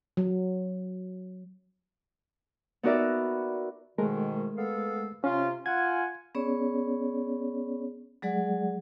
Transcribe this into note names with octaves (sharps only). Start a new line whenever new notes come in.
F#3
B3 D#4 F#4 A#4 D5 E5
G#2 B2 D#3 G#3 A3 A#4
B3 A4 F5
C3 C#4 F4
F4 F#5 G#5 G#6
B3 C#4 G#4 C#5 D5
F#3 G#3 G#4 D5 F#5